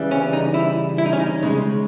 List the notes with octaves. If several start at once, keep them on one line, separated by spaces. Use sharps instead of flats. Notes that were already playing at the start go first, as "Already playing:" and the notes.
Already playing: C#3 E3 G3
C#4
D#4
E4
E4
D#4
C#4
D#4
C#3 G#3